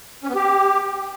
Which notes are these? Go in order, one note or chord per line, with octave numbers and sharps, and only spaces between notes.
C#4
B3
G4